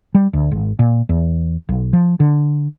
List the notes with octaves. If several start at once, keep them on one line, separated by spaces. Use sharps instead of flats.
G3
D2
G#1
A#2
E2
B1
F3
D3